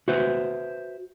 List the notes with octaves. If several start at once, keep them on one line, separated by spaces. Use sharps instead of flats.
F#4 B4 C5 E5